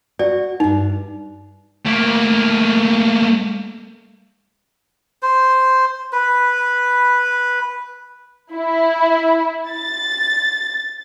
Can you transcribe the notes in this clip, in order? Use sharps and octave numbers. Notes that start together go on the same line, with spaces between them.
F#4 D5
E2 G2 D#4
A3 A#3
C5
B4
E4
A6